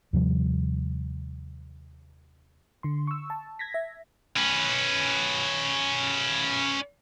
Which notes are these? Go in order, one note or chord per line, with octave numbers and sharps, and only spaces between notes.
D#2 C3 F3 G3
D3 C6
C#6 E6
A5
G#6 A#6 B6
E5
C#4 B4